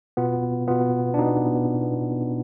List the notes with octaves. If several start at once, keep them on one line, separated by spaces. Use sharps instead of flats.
B2 B3 F4
B2 B3 F4
D4
B2 B3 D#4